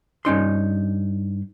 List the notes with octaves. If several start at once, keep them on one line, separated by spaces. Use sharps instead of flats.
G2 C#4 D#4 C6